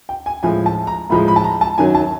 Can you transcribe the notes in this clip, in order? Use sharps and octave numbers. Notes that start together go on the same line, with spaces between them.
G5
G#5
A2 F3 G#3 G#5
A5
A#5
A2 F3 G#3 B5
B5
A5
A#5
A5
F#2 D#3 F#3 G#5
A5